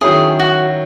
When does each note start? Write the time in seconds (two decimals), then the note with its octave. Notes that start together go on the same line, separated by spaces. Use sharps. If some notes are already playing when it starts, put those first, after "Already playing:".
0.01 D#3 F#3 C#4 E4 G#4
0.39 F#4